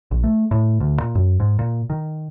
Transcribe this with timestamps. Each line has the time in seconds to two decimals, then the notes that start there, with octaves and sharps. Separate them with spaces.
0.11 A#1
0.24 A3
0.51 A2
0.80 D2
1.00 A#2
1.15 F#2
1.40 G#2
1.59 A#2
1.90 D#3